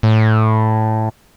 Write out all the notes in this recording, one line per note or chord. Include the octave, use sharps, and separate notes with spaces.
A2